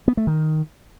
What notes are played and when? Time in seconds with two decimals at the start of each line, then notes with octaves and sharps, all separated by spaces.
0.08 B3
0.17 A3
0.27 D#3